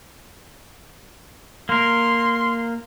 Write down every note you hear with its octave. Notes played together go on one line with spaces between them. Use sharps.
A#3 A#4 C6